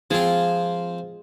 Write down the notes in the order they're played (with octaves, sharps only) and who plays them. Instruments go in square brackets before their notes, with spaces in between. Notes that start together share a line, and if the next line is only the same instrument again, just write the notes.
[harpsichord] F3 C4 [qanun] G#3 F4 G#4